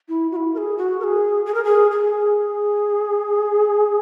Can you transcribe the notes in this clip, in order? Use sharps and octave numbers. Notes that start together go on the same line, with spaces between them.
E4
F#4
E4
A#4
G#4
F#4
A#4
G#4
G#4
A#4
G#4
G#4